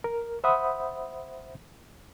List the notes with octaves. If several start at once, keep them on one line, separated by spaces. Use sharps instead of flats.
A#4
C5 E5 F#5 B5 D#6